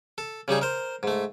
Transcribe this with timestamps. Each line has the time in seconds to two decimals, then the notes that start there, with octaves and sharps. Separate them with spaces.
0.18 A4
0.48 C#3 G3 D#4 G#4
0.61 A#4 C5
1.03 G#2 A3